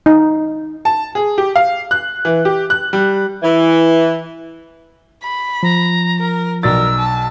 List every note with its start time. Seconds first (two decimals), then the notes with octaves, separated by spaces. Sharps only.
0.06 D#4
0.85 A5
1.15 G#4
1.38 G4
1.56 F5
1.91 F#6
2.25 E3
2.45 G4
2.70 F#6
2.93 G3
3.43 E3
5.23 B5
5.63 F3 A#5
6.19 A#4
6.63 B1 A#4 D5 E6 A6
6.98 A5